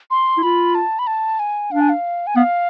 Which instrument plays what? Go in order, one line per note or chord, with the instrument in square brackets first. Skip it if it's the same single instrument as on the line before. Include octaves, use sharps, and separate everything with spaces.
[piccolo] C6
[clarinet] E4
[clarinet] F4 [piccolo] B5
[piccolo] A5
B5
A5
G#5
[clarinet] D4 [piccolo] F5
[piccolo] G#5
F5
G#5
[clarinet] B3 [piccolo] F5